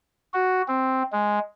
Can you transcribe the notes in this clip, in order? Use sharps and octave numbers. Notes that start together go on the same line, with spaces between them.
F#4
C4
G#3